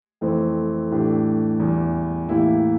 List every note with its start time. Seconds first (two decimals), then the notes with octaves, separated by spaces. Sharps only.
0.21 F2 E3 A3 C4
0.90 A2 E3 A3 D4 G4
1.60 E2 E3 G3
2.28 A2 E3 A#3 E4 G4